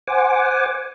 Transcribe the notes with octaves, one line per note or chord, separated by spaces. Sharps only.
C5 F#5 G#5 D6